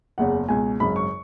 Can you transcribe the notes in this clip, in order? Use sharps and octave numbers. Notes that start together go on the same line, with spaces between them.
F#1 E2 C#3 F#5
C#2 B2 G#5
G#1 F#2 C#3 B5
C#6